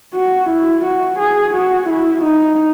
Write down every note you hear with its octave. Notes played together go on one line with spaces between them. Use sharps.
F#4
E4
F#4
G#4
F#4
E4
D#4